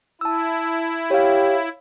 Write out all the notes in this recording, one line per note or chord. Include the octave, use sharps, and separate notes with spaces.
E4 A5 E6
G4 C#5 F5